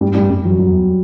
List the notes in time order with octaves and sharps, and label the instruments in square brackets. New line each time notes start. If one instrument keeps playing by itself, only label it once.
[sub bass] G2 [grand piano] G3
[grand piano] G3
[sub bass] G2
[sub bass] F#2 [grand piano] G3
[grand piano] F#3
[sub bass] F#2 [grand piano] F#3
[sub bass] E2